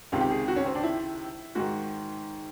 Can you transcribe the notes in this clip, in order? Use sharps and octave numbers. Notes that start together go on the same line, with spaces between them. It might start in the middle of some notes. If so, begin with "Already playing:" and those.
C#2 C3 D#3 F4
G4
G#4
F#4
C#4
C4
D4
E4
G#2 D#3 F#4